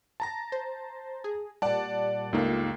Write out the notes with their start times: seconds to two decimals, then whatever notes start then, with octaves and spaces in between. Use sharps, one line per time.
0.20 A5 A#5 A#6
0.52 C5
1.24 G#4
1.62 A#2 G3 D5 F#5 A5
2.33 C#2 G2 A3 A#3 D#4 F4